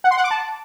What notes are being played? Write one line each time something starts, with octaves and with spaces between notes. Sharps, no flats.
F#5
C6
F#5
D6
A5